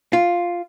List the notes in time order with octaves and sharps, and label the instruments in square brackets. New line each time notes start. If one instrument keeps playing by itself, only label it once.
[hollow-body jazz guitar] F4